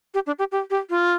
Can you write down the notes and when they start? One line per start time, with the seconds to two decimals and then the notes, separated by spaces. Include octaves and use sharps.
0.14 G4
0.27 D4
0.39 G4
0.52 G4
0.70 G4
0.90 F4